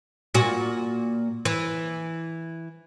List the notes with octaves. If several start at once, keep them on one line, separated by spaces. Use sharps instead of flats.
A#2 F#4
E3